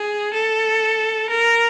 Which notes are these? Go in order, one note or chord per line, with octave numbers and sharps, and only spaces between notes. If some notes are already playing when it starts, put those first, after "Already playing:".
Already playing: G#4
A4
A#4